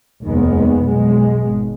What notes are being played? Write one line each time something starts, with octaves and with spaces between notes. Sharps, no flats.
F1 D#2 D#3 G#3 B3
B1 B2 G#3
G#1